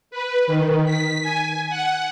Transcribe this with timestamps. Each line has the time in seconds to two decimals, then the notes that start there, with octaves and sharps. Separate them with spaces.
0.11 B4
0.47 D#3
0.85 B6
1.22 G#5
1.69 F#5